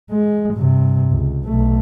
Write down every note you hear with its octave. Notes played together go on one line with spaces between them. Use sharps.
G#3
G2 C3
C#2
B1 A3